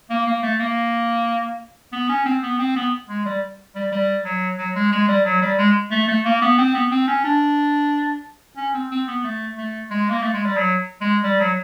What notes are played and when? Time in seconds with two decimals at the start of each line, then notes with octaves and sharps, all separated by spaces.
0.10 A#3
0.27 A#3
0.43 A3
0.60 A#3
1.93 B3
2.09 C#4
2.26 C4
2.43 B3
2.59 C4
2.76 B3
3.09 G#3
3.26 G3
3.75 G3
3.92 G3
4.25 F#3
4.58 F#3
4.75 G#3
4.92 G#3
5.08 G3
5.25 F#3
5.42 G3
5.58 G#3
5.91 A3
6.08 A3
6.25 A#3
6.42 B3
6.58 C4
6.75 B3
6.91 C4
7.08 C#4
7.24 D4
8.57 C#4
8.74 C4
8.91 C4
9.07 B3
9.24 A3
9.57 A3
9.91 G#3
10.10 A#3
10.22 A3
10.34 G#3
10.45 G3
10.57 F#3
11.01 G#3
11.24 G3
11.40 F#3